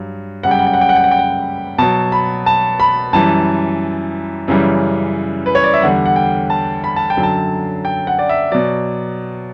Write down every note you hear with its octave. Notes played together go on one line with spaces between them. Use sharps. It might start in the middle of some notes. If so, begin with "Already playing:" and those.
Already playing: G2 F#3
F#2 C#3 G3 F#5
G5
F#5
G5
F#5
G5
F#5
G5
F#5
G5
F#5
B2 F#3 A5
B5
A5
B5
F#2 E3 G3 A5
F#2 C#3 E3 G3
B4
C#5
D5
E5
E2 D3 G3 F#5
F#5
G5
A5
B5
A5
G5
F#2 D3 F#3
A5
G5
F#5
D5
E5
B2 F#3 D5